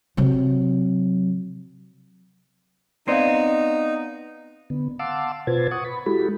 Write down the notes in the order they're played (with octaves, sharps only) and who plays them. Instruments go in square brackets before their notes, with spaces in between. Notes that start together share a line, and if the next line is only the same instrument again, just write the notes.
[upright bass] C3 F#3
[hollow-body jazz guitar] B3 C4 [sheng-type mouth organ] D#4 [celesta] D5 F5
[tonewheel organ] D3 B3
F5 F#5 A5 C6 D6 E6
B2 F4 B4 C5 G#6 A6
F#5 C#6 D#6
B5
G#3 E4 F#4 G4 A4 B5